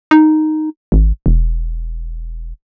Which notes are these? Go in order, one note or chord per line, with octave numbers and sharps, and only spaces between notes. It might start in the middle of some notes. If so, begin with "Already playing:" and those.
D#4
G#1
E1